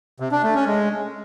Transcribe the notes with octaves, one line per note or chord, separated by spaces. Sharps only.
C3
D4
A3
C#4
G#3